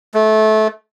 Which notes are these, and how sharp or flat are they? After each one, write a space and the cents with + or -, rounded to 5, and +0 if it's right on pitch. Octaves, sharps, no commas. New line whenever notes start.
A3 -20